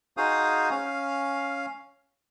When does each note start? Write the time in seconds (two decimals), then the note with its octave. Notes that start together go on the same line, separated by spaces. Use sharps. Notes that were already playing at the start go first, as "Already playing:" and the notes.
0.17 D#4 F#4 G#4 C5 F5 D#6
0.71 C#4 F5